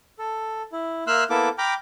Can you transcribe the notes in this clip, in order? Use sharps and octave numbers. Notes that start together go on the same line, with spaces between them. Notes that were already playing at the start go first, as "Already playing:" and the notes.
A4
E4
A#3 E5 F5 C6 E6 F#6
A#3 B3 E4 A4 E5 D6
G5 A#5 B5 D6 F6